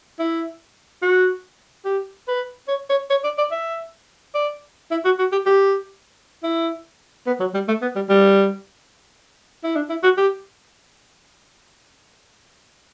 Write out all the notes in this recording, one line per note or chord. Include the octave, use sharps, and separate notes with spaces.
E4
F#4
G4
B4
C#5
C#5
C#5
D5
D5
E5
D5
E4
F#4
F#4
G4
G4
E4
B3
F#3
G3
A3
B3
G3
G3
E4
D4
E4
F#4
G4